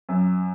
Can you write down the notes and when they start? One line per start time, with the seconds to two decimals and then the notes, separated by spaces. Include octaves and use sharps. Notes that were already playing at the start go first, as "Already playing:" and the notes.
0.09 F#2